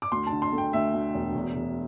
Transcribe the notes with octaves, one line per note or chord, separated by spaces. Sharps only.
D6
D2 C6
A5
D3
C6
A3
G5
D2 E5
D2
E1
E2
E2